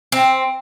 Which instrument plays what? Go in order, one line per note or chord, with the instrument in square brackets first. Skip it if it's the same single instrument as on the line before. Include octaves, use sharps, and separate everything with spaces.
[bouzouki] C4